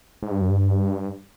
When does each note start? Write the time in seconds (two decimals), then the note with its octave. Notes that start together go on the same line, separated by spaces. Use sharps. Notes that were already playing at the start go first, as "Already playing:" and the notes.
0.23 G#2
0.31 G2
0.41 F#2
0.50 G2